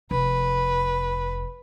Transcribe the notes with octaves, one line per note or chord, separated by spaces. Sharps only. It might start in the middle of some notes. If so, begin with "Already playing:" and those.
F1 B4